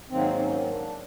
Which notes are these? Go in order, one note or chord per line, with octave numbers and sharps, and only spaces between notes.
G#2 D#3 F#3 A#3 C4
C#4
D4